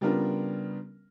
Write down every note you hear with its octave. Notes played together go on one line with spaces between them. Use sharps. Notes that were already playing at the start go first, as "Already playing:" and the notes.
C#3 G3 B3 D4 F4 A#4